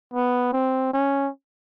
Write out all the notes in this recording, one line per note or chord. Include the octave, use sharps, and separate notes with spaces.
B3
C4
C#4